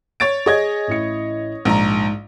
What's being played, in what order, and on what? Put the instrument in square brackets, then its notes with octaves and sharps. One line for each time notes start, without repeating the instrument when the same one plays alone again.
[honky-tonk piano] C#5 A6 D7
[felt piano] G#4 G#5 [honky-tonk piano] C#5 D#5 G#6
[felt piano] A1 E4 C#7
[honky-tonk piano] A#1 A#5 [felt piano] G#2